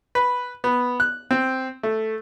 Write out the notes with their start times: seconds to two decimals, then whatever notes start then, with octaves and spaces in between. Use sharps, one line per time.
0.15 B4
0.64 B3
1.00 F#6
1.31 C4
1.83 A3